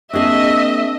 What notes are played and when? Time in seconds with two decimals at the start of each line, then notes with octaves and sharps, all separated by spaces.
0.13 A#3 C4 D4 G#4 D#5 E5